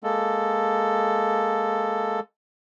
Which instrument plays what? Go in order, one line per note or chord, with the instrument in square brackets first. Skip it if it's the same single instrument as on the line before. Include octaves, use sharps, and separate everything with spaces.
[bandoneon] G#3 A#3 A4